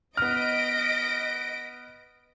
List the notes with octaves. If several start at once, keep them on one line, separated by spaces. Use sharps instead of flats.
B3 D#5 F6 A#6 B6 D7